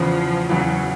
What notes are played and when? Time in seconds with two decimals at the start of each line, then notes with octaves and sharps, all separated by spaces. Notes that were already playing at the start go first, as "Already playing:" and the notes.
Already playing: E2 C#3 E3 F3
0.50 E2 C#3 E3 F#3